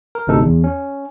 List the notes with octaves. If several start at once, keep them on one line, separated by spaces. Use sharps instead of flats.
A#4
G1 D2 C3 D#4 A4
E2
C#4